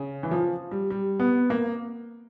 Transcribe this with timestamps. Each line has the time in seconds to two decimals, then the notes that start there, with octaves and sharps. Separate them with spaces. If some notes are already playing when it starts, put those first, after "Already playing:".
Already playing: C#3
0.23 E3
0.31 F3
0.71 G3
0.90 G3
1.20 B3
1.50 A#3